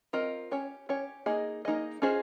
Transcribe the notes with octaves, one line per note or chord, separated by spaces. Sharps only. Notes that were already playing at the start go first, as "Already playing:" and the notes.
C4 F4 A#4 D#5
C#4 G4 C#5
C#4 G4 C#5
A#3 D#4 G#4 D#5
A#3 D#4 G#4 D#5
C#4 F4 G#4 C5 D#5